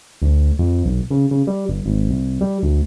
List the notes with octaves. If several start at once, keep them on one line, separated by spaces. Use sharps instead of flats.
D2
F2
B1
C#3
C#3
G3
G1
G#1
C2
G3
D2